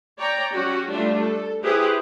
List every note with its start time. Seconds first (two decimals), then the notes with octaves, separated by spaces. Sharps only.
0.17 C#5 D5 G5 A#5
0.53 F#3 C#4 F#4 G4
0.89 G3 A3 D4 F4
1.20 A4
1.63 E4 G4 G#4 B4 C5